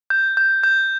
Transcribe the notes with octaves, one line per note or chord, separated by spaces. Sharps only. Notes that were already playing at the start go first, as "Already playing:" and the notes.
G6
G6
G6